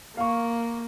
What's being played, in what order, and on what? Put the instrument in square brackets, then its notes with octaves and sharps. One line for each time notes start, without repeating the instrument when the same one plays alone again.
[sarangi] A#3 [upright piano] F5 C#6